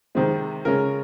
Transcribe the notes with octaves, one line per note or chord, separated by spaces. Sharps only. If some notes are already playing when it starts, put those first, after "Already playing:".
C3 D#3 G#3 C4
C#3 G#3 C#4 A#4